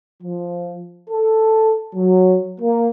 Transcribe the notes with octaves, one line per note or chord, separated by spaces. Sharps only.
F3
A4
F#3
A#3